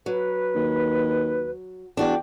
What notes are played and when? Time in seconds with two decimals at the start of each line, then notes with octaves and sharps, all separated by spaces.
0.06 F#3 B4
0.55 D#2
1.97 E2 D4 F#4 D5 G5